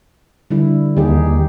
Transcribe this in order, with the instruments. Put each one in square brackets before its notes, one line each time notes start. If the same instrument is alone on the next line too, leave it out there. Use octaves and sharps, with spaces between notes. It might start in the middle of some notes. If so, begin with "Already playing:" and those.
[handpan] D3 G3 E4
[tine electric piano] D#2 [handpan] D#4 G#4 [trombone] G4